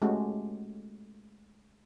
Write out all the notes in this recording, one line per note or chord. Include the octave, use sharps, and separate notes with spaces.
G#3 A3 C#4 F#4 G4